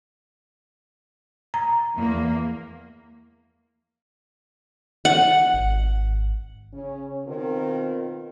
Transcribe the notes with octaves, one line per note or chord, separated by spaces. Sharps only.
A#5
E2 A#3
F#5
G#1
C#3 C#4
B2 D#3 C4 F4 A#4